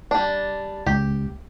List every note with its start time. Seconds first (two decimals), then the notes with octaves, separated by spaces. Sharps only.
0.11 G3 D4
0.86 C#2 G4